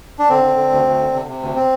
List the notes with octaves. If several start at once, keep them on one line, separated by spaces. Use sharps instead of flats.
D4
D3 C4
D3
D3
D2
D2
D3
C3
C3
D2
C4